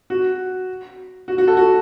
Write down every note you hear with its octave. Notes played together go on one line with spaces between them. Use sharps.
F#4
F#4
F#4
A4
F#4